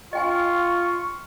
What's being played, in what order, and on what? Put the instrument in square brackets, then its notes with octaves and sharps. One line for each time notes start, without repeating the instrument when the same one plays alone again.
[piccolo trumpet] F4 [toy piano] D#5 G5 G#5 [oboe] C#6